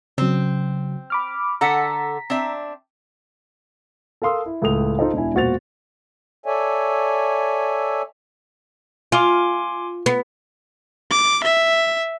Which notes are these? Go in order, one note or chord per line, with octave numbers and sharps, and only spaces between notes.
C#3 F#3 C4
B5 D6 F6
D3 A4 F#5 A#5 B6
C4 D4 E5
A4 A#4 F5 C6 D#6 E6
E4
C#2 A2 A4 D#6 F7
D#4 F4 A4 C5 D#5
E1 D4 E4 G#5
E1 A#2 F#4 C5 A6 F7
A4 C#5 D5 E5 G#5
F4 G#5 C6 D6
B3
D6
E5